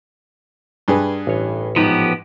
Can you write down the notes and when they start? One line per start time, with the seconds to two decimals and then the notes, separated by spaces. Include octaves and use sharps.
0.88 G2 G#4 B4
1.27 A1 C#5
1.76 G#2 F3 B3 G4